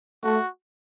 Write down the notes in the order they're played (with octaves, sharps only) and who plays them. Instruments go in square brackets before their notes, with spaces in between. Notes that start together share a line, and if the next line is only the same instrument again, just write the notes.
[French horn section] A3 [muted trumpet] F#4